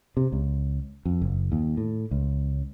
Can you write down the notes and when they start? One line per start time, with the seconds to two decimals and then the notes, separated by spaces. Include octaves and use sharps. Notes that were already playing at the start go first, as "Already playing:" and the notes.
0.17 C3
0.32 C#2
1.05 F2
1.22 F#1
1.52 D#2
1.77 A2
2.11 C#2